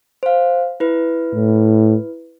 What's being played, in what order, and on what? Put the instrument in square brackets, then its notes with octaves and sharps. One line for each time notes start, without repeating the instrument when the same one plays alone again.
[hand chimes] C5 F5
E4 B4
[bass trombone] A2